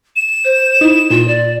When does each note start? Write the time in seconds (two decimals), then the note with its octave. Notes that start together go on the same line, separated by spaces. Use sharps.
0.16 E7
0.45 C5
0.81 D#4 E4
1.10 A#2 F4
1.28 D5